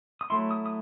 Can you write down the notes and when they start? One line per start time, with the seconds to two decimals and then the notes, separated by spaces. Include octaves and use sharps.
0.21 D#6
0.30 F#3 A3 E4 C6
0.51 D#6
0.66 D#6